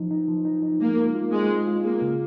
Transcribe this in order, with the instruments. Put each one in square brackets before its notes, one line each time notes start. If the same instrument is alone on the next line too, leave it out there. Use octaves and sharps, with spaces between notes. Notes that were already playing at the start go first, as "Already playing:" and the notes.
Already playing: [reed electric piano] F3 D#4
D#4
F3
D#4
D#4
[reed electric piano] G#3 [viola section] A#3
[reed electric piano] F4
F4
[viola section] G#3 [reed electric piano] C4
[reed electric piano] C4
F4
[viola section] A#3 [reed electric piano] G#4
[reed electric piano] C#3